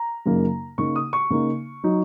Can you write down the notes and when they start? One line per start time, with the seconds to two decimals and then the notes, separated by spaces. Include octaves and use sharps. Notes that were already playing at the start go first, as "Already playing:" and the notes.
Already playing: A#5
0.26 F#2 C#3 A#3 D#4
0.78 C#3 A#3 D#4 C#6
0.96 D#6
1.13 C#6
1.30 C#3 A#3 D#4
1.84 F#3 D#4